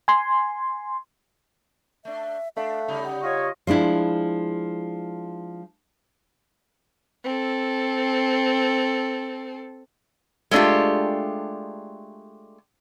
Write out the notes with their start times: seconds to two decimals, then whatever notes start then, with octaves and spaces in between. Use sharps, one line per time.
0.08 G#5 C6
2.05 A3 D4 E5
2.57 A3 D4 F5
2.88 C#3 G3 D#4
3.04 F#5
3.23 F4 C#5 D#5 C#6
3.67 F3 G#3 D4 E4
7.24 C4 A4
10.51 G#3 A3 D4 F4 G4